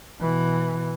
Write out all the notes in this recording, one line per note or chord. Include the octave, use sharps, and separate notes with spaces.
B2 E3